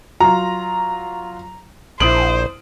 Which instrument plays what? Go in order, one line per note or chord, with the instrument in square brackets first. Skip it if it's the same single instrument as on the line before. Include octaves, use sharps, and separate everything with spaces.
[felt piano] F#3 F4 [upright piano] A#5
[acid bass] A#1 [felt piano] E4 D#6 D7 [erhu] C5 [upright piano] F#7